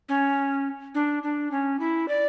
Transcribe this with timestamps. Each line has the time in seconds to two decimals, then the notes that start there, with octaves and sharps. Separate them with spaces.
0.09 C#4
0.94 D4
1.23 D4
1.51 C#4
1.79 E4
2.08 D5